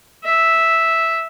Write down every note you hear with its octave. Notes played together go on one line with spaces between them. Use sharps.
E5